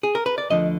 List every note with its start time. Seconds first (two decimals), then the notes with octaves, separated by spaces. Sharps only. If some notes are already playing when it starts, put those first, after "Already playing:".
0.03 G#4
0.15 A#4
0.26 B4
0.38 D5
0.50 D2 D3 F3 D#5